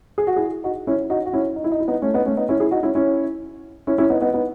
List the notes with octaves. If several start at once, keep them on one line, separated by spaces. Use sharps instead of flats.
G#4
F#4
E4 G#4
D#4 F#4
C#4 E4
D#4 F#4
F#4
C#4 E4
D#4
E4
D#4
E4
B3 D#4
A3 C#4
B3 D#4
A3 C#4
B3 D#4
C#4 E4
E4 G#4
D#4 F#4
C#4 E4
C#4 E4
C#4 E4
C#4 E4
B3 D#4
B3 D#4
B3 D#4